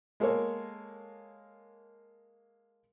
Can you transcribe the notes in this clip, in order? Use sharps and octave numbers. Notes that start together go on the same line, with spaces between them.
G#3 A#3 A4 A#4 C#5